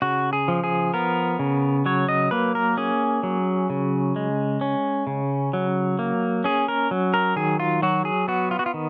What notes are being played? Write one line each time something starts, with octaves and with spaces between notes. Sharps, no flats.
C#3 F#4
G#4
F3
G#4
B3 A#4
C#3
F#3 C#5
D#5
A#3 B4
A#4
C#4 G#4
F#3
C#3
G#3
C#4
C#3
F#3
A#3
C#4 G#4
A#4
F#3
A#4
D#3 G#4
F4
F#3 F#4
G#4
B3 F#4
F4
F#4
F4
D#3